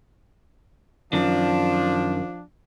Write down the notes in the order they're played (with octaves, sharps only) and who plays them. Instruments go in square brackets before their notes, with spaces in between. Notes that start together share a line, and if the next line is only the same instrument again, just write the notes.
[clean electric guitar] F#2 D#3 [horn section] F3 D4